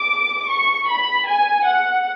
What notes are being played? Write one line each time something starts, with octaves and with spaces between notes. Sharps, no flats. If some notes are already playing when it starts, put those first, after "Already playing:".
Already playing: D6
C#6
B5
G#5
F#5